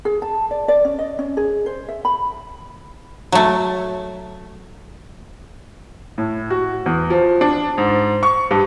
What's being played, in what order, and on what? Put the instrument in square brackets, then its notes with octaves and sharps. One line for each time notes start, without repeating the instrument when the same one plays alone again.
[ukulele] G#4
A5
D5
D5
C#4
D#5
C#4
G#4
C5
E5
B5
[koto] F#3 A3
[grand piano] A2
F#4
E2
F3
D4
G#2
C#6
G2